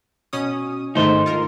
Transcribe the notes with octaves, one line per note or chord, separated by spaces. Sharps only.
B2 C#4 D#6
G#2 D#3 A3 D#4 C5
F4 A#4